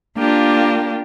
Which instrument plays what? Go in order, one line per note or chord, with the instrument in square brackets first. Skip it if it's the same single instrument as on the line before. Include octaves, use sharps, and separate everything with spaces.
[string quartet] A#3 D4 F4 G4